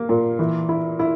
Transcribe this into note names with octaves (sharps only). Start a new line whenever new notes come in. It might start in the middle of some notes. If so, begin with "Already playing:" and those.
Already playing: A#3
A#2
E3
E4
E4